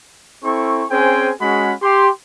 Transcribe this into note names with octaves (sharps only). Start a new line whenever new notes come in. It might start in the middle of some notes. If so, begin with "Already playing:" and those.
C4 E4 A4 C#6
C4 C#4 G#4 C5 G5 G#5
G#3 C#4 F#4 G#4 F#5 B5
G4 C6